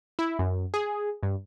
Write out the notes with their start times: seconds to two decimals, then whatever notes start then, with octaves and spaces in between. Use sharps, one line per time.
0.19 E4
0.39 F#2
0.74 G#4
1.23 G2